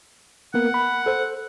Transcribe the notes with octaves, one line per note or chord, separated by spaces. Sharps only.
A#3 B3 A#4 F#5
B5
A4 C5